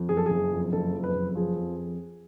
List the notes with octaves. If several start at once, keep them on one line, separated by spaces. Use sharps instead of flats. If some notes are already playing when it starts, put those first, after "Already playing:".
Already playing: F2
F#1 G#4
A4
F#1 G#4
F2
F#1 A4
F2
B4
F#1
F3 G#4
F2